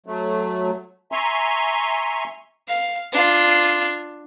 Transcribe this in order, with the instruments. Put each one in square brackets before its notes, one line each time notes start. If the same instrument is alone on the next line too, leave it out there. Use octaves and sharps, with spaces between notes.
[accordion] F#3 A3
E5 G#5 A#5 C6 C#6
[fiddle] F5
D4 F4